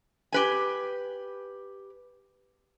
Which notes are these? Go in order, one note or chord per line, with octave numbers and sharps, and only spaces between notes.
G4 B4 G#5